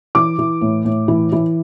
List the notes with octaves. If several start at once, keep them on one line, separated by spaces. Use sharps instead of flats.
E3 D6
E3
A2
A2
E3
E3